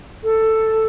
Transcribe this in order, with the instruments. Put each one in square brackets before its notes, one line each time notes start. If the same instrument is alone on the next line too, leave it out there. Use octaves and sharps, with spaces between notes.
[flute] A4